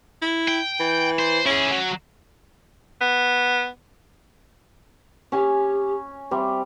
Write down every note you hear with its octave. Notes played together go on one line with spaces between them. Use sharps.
E4
G5
E3
C5
C#4 E4 G#4
F#3
B3
C#4 G4 G#5
G3 C4 E5